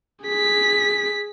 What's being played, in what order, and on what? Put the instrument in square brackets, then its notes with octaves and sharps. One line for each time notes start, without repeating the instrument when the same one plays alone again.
[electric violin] G#4 B6